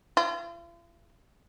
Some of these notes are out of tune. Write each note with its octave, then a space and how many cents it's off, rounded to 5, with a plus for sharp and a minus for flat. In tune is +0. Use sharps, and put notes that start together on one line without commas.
F4 -45